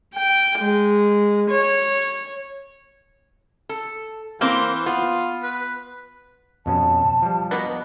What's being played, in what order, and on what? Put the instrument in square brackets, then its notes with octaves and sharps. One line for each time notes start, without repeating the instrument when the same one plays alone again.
[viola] G5
G#3
C#5
[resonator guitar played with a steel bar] A4
[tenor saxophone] E3 [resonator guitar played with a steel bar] A#3 C4 C5
[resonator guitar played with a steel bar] B3 [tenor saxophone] F4
[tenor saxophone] B4
[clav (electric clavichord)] F2 B2 C#4 [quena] A5
[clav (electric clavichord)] F3 G3
[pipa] B2 A#3 B3